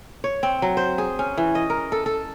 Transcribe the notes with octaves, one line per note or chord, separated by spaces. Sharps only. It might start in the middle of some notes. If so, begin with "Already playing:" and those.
C#5
C4
F#3
C5
G#4
C#4
E3
D#5
A#4
A4
A4